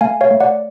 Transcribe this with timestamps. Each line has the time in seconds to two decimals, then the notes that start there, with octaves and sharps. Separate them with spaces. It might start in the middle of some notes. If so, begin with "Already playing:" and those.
0.01 A3 F5 G#5
0.21 C#5 F5
0.31 A3
0.40 D5 F#5